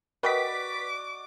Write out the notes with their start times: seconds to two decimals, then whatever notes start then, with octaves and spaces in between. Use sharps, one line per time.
0.23 F#4 A#4 B4 D5 D#5 G5 D6 B6